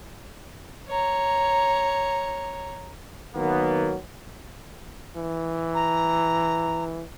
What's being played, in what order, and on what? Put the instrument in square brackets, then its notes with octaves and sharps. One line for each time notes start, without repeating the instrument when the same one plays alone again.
[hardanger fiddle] C#5 A#5
[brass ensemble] D#3 F#3 A#3 B3
[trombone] E3
[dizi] A#5